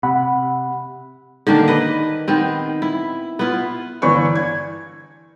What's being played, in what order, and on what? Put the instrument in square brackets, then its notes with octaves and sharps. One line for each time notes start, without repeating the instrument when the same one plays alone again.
[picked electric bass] C3 [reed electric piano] F#5 B5
[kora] D3 D#3 A#3 D4
B4 D#5
D#3 B3 C4
E4
B3 E4 F4
[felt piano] G1 E3 D5 C#6
G#6